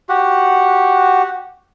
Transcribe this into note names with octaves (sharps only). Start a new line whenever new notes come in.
F#4 G4 F#5